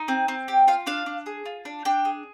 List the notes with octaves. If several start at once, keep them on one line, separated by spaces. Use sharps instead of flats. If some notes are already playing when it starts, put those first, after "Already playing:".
Already playing: D#4
C4
C4
G4
F4 F5
D4 F5
D4
G#4
F4
D4
D4 G5
G#4